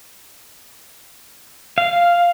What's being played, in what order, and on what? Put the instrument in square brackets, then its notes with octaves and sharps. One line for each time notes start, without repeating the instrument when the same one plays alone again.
[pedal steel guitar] F5